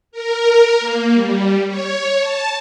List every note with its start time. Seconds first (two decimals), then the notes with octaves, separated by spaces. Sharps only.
0.12 A#4
0.80 A#3
1.13 G3
1.68 C#5
2.19 A5